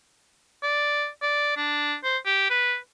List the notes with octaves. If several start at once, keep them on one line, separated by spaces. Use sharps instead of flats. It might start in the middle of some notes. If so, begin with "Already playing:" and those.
D5
D5
D4
C5
G4
B4